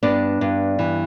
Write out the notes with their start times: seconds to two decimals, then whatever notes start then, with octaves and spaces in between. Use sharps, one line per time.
0.03 G2 B3 D4
0.41 G2
0.79 E3